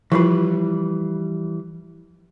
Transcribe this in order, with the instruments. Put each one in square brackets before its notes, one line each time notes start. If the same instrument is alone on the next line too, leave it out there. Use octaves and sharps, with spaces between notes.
[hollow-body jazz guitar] E3 G3 B4 [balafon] F3 E4 F4